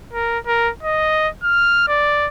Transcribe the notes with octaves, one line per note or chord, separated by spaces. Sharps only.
A#4
A#4
D#5
F6
D5